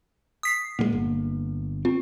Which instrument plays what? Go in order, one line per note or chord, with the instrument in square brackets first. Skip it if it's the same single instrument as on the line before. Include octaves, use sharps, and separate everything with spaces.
[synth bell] D#6 B6 C7
[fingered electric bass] A#2 F#3 G#3 [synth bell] A#3
[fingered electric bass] G1
[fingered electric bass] C4 [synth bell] F4